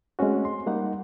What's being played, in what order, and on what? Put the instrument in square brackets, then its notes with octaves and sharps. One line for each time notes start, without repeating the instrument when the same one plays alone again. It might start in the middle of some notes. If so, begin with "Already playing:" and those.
[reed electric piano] G#3 A3 C4 C#4 F#4
C6
G3 A#3 D#4 F#5